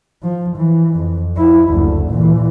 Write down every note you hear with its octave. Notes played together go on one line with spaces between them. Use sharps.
F3
E3
F2
F3 E4
F#1 D2
A#2 E3